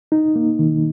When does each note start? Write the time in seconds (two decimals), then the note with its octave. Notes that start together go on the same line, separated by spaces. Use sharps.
0.12 D#4
0.36 A#3
0.59 D#3